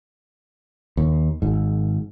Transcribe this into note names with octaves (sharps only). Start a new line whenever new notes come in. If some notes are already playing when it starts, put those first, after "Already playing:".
D#2
G#1 G#2